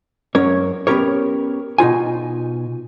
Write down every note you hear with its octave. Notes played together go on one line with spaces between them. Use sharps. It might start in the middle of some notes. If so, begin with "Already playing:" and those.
F#2 C#4 A#4 C#5
B3 C#4 G4 A#4 C#5
B2 D#4 F4 G#5